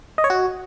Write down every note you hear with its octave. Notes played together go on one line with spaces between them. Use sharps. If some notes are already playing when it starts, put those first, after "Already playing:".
D#5
C#5
F#4